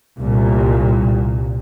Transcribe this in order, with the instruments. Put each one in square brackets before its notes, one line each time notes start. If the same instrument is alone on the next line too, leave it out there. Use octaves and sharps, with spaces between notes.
[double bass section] C2 A#2